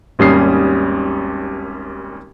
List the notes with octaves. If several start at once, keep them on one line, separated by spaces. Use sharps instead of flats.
G#1 D#2 G3 C#4 D#6 C7